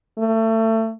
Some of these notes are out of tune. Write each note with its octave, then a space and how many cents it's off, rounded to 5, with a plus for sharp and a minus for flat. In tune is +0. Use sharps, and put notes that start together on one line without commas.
A3 +25